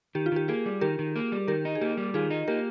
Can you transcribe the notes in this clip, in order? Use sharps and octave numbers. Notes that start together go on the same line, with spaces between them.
D#3 G4
F4
D#3 G4
A#3 F4 G#4
G3
D#3 G4 A#4
D#3
A#3
G3
D#3 G4 A#4
D#4
G#4
A#3 G4
G3
D#3 F4 G#4
D#4
A#3 G4 A#4